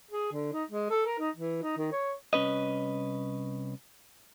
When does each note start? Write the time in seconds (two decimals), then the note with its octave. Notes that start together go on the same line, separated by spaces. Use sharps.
0.11 G#4
0.32 D3
0.53 D#4
0.70 G#3
0.90 A4
1.06 A#4
1.19 D#4
1.36 E3
1.62 D#4
1.77 D#3
1.92 C#5
2.33 C2 C#4 B4 D#5